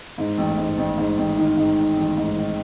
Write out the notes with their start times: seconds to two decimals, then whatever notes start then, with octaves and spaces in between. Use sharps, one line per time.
0.18 G#2
0.38 A1
0.57 G#2
0.78 A1
0.98 G#2
1.18 A1
1.37 D#3
1.57 G#2
1.77 D#3
1.97 A1
2.17 G#2
2.37 D#3